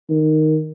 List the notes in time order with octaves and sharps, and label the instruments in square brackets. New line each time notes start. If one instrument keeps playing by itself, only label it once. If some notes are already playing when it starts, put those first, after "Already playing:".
[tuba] D#3